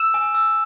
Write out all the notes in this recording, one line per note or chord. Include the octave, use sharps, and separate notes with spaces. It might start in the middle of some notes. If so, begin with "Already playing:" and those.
Already playing: E6 E7
G#5
E6